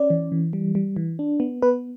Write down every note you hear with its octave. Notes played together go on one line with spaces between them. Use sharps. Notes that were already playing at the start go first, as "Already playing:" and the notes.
Already playing: C#4 D5
E3
E3
G3
G3
E3
D4
B3
B3 B4